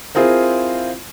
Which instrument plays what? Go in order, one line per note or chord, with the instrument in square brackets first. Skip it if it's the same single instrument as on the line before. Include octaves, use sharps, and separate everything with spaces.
[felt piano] C4 E4 F4 G#4 A#4 C5